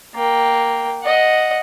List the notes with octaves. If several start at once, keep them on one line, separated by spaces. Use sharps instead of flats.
A#3 G5
D#5 F#5